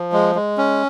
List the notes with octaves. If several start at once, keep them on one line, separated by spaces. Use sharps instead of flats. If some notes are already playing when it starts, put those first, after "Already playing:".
Already playing: F3
G#3
G#3
C#4